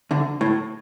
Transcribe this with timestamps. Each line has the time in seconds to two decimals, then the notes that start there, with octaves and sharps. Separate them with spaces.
0.11 D2 D3
0.41 A2